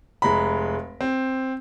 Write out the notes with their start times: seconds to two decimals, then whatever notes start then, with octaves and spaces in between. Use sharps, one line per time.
0.22 F1 G#3 A#5 B5
1.01 C4